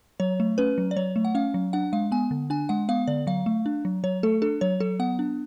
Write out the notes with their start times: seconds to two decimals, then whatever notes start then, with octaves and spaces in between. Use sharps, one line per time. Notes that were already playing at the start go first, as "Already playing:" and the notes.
0.20 F#3 C#5
0.40 A3
0.58 C#4 B4
0.78 F#3
0.91 D5
0.96 F#3 C#5
1.16 A3
1.25 F#5
1.35 C#4 F5
1.54 F#3
1.73 D4 F#5
1.93 G#3 F5
2.12 B3 G#5
2.31 D3
2.50 D4 G#5
2.69 G#3 F#5
2.89 B3 F5
3.07 D3 D5
3.27 F#3 F5
3.46 A3
3.66 D4
3.85 F#3
4.04 F#3 C#5
4.23 A3 A4
4.42 D4 A4
4.61 F#3 C#5
4.80 F#3 A4
4.99 B3 F#5
5.19 D4